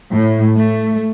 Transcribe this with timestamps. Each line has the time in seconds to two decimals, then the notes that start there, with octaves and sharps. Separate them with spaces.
0.11 A2
0.58 A3